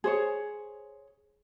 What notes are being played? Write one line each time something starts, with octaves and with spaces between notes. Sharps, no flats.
G#4 C5 C#5